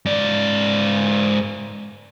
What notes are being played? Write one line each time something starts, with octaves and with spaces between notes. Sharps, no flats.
G#2 D5